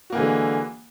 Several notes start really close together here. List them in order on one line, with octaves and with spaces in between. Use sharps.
F#4 A#3 E3 D3 G#3